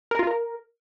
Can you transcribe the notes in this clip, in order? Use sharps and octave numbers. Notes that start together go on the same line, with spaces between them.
A#4
F4
A#4